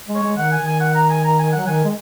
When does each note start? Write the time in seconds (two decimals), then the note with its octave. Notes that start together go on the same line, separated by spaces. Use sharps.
0.09 G#3
0.15 C#5
0.23 G#3
0.37 D#3 F#5
0.52 G#5
0.59 D#3
0.66 G#5
0.80 F#5
0.95 A#5
1.10 G#5
1.24 A#5
1.39 G#5
1.52 F#3 F#5
1.67 D#3 G#5
1.84 G#3